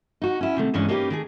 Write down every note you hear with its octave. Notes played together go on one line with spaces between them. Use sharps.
D#4 F#4
C#4 E4
C3 D#3 A3
E2 G2 E3 G#3 C#4
A#3 C#4 D#4 F#4 G4 B4
D#3 A3 G#4